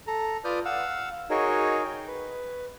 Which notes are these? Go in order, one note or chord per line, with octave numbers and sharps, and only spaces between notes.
A4 A#5
F4 B4 D5 D#6 F6 G6
F5 F#5 E6
D#4 F#4 G#4 A#4 C#5 D#5
G5
B4